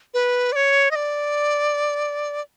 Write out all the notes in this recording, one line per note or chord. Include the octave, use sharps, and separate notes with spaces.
B4
D5
C#5
D#5
D5